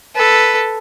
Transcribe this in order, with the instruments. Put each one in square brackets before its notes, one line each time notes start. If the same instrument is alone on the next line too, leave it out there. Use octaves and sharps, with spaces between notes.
[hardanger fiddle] A4 B4